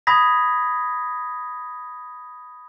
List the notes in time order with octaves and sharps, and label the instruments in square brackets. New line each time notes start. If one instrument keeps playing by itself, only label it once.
[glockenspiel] B5 D#6 G#6 A#6 B6